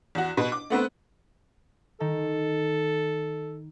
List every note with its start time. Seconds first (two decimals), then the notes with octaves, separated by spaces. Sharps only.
0.15 E2 F#4
0.37 B2 B4
0.52 D6
0.70 A3 B3 C4 B4
2.00 D#3 A4